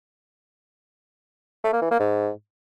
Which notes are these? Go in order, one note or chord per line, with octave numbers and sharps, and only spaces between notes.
A3
A#3
E3
A#3
G#2